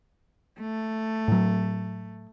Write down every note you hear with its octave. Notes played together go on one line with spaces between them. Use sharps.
A3
A2 F#3